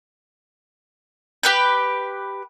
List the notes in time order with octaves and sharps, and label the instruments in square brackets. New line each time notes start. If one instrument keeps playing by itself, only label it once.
[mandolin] G4 B4 G5